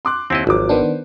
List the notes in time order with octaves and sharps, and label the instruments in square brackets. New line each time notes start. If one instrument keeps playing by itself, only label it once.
[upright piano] C6 D6 F#6
[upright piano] D#2 [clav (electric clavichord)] C4 E4 D#5
[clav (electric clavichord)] G#1 [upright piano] F3 F#3 D6
[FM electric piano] D#3 B3 D4 [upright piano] C5